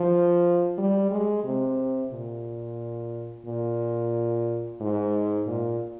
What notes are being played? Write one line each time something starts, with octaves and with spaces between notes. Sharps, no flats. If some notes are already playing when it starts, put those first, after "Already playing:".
Already playing: F3
G3
G#3
C3
A#2
A#2
G#2
A#2